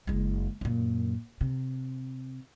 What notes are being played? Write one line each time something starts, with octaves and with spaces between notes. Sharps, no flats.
F#1 G#3
F#2 A#2
C3